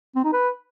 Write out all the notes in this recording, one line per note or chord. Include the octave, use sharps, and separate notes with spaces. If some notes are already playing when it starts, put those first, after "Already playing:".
C4
D#4
B4